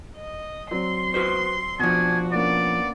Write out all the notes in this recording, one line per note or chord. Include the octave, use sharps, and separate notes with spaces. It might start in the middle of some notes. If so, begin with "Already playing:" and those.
D#5
F#3 C4 D5 C6
F#4 B4 C5
B2 F3 D4 F#4 G#5
A#3 B3 C#4 D4 D5